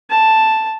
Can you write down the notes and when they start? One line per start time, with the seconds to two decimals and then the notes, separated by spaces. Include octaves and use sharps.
0.10 A5